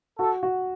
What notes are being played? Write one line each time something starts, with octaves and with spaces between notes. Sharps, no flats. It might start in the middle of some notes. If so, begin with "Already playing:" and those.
F#4 A4
F#4